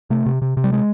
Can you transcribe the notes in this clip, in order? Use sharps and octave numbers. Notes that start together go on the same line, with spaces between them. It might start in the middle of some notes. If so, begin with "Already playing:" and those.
C3 A3
C3
C3
C3
G3
G#3